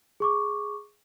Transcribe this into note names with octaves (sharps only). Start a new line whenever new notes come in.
G#4 C#6 D6